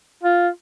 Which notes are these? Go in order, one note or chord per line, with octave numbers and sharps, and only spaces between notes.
F4